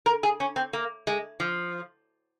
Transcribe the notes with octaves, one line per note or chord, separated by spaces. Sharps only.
A#4
G#4
C#4
C4
A#3
G#3
F3